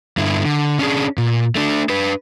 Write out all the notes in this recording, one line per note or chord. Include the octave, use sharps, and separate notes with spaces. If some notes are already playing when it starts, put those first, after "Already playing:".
G2 D3 E4
D3
C#4 D4 G#4
A#2
A3 D4
D4 B4